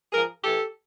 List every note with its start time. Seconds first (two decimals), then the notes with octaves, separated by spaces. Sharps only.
0.12 G#2 F3 G#4 A#4
0.44 A2 E3 G4 A4